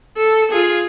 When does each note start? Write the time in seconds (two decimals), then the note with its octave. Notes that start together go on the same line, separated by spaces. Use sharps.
0.16 A4
0.52 F4 G#4